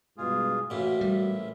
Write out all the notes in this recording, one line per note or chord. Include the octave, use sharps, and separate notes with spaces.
G2 B2 G#3 F4 G#4
A1 A#2 F#4 E5
G3